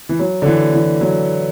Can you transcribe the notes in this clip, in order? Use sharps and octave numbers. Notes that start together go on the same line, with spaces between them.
E3
F#3
D3
E3
E3
F#3